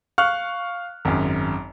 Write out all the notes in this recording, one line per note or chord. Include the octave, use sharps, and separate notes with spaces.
F5 C#6 F6 F#6
G#1 F#2